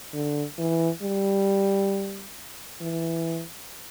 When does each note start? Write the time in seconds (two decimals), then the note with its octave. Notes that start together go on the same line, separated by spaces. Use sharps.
0.13 D3
0.59 E3
1.03 G3
2.81 E3